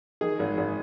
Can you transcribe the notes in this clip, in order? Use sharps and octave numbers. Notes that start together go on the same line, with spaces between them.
D#3 G#4
G#1
G#1